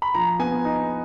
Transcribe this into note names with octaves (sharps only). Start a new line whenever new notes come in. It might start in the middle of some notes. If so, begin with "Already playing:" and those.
B5
F3 A#5
B3 G#5
D#4